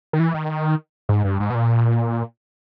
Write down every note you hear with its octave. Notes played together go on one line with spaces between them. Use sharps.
D#3
E3
D#3
G#2
G2
G#2
B2
A#2